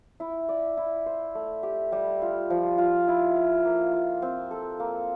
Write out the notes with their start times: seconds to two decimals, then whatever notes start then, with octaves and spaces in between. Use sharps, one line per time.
0.20 E4
0.49 D5
0.77 E4
1.06 C5
1.35 A3
1.63 G4
1.92 G3
2.22 F4
2.50 F3
2.78 F4
3.08 E4
3.35 F5
3.65 A#3
3.93 F4
4.22 C4
4.51 A4
4.80 A#3